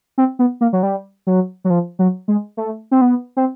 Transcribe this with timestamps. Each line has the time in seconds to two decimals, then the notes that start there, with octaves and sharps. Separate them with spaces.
0.18 C4
0.39 B3
0.61 A#3
0.73 F#3
0.83 G3
1.27 F#3
1.65 F#3
1.70 F3
1.99 F#3
2.28 G#3
2.57 A3
2.91 C4
3.01 B3
3.37 C4